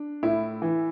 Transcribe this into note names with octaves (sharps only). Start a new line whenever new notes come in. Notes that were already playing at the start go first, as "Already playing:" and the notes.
Already playing: D4
A2 E4
E3